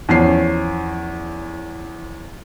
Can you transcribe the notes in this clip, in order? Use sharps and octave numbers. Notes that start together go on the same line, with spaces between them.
E2 F3 C#4 G#5 C7